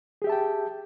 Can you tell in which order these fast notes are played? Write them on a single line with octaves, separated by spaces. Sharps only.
G#4 G4 E5 A5 G5